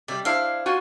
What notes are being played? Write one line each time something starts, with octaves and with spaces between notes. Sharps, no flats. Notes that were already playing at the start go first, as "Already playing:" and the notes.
C3 G3 D5
D4 E4 C5 F5
F4 F#4 G#5